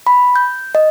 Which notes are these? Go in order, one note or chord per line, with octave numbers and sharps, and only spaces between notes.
B5
G6
D#5